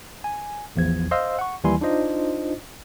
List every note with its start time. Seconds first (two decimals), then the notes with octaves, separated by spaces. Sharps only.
0.24 G#5
0.76 A1 E2 F3 G#6
1.11 C5 D#5 F5 C6 E6
1.39 F#5 C#6
1.64 D#2 E3 G3 E4 G#5 C6
1.81 D4 D#4 F4 C5 D#5